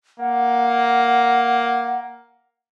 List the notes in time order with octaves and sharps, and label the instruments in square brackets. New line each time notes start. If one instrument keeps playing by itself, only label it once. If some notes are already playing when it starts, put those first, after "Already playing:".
[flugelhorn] A#3 [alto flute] F#5